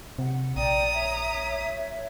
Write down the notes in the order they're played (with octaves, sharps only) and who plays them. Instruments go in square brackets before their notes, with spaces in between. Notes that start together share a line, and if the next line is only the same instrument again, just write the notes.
[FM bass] C3 [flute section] F#5
[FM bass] A#1 [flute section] D5 G5 [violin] A#5 D#6
[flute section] C#5 E5